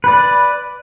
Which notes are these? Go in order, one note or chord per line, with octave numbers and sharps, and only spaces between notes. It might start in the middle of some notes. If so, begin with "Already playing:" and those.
B4 D5